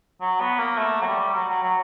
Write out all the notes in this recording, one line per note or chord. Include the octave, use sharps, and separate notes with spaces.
F#3
B3
A#3
A3
F#3
G3
F#3
F#3
F#3